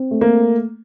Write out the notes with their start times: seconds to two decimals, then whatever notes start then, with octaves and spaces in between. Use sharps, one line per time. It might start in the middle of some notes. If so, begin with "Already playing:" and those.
Already playing: C4
0.11 A3
0.21 A#3